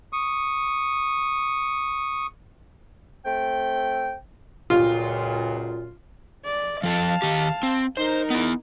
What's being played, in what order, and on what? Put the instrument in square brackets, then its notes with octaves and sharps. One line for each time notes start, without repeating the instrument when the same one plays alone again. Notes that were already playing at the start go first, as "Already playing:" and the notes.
[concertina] C#6 D#6
[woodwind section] A3 C4 G5
[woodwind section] C#2 F#2 A#2 [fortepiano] F4
[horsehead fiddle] D5
[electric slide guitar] F3 A4 [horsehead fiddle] F5 A5
[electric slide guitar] D#3 G4
C4
[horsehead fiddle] D#4 A#4 [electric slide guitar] C5
[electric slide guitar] B3 E4